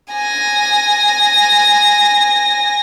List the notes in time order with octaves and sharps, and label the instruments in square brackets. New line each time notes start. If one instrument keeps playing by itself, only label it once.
[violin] G#5 A#6